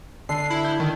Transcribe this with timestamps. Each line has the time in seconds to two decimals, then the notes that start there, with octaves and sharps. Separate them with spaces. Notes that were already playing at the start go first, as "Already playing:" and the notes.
0.29 D3 C7
0.51 E4
0.65 G6
0.80 D#3